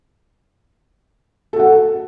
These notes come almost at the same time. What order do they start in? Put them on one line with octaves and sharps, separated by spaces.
A4 F#4 F#5